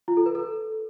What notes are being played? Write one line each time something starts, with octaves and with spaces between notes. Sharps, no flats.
F4
A4
B4
A4